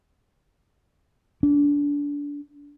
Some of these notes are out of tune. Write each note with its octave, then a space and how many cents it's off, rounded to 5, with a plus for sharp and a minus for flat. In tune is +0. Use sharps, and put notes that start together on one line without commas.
D4 -25